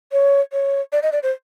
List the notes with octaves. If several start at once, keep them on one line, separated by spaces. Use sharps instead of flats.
C#5
C#5
D5
D#5
D5
C5